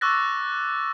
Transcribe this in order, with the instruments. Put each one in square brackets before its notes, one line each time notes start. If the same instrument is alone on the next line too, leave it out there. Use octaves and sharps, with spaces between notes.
[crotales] C#6 D6 E6 F#6 A6 A#6